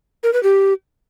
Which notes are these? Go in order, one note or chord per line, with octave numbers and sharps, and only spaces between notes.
A#4
B4
G4